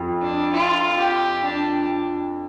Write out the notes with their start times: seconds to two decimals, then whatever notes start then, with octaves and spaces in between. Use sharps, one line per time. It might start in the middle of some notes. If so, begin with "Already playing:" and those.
Already playing: F2
0.22 D4
0.53 F4
0.99 G4
1.44 D4